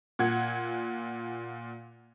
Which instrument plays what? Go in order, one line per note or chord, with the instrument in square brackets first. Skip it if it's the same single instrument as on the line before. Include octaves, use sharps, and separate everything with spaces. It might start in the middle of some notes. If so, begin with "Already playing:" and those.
[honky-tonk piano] A#2 F#5 G#6